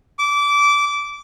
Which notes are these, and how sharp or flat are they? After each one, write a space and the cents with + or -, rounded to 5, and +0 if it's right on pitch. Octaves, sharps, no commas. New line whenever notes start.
D6 -20